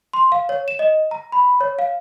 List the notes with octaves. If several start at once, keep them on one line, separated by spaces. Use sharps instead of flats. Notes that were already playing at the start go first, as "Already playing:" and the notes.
C6
F5
C#5
E7
D#5
A#5
B5
C#5
F5